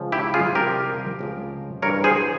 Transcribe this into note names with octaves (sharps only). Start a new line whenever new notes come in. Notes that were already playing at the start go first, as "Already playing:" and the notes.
Already playing: C#2 C#3 F3
E4 G4
F4 G#4
C2 C3 F3 G4 A#4
C#2 C#3 F3
G2 E3 A#4 C#5
G#4 C5